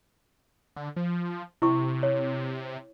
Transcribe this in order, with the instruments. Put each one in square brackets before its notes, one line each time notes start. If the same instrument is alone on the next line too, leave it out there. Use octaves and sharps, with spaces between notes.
[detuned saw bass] D3
F3
[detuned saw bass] C3 [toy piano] E4 C#6
[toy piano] C#5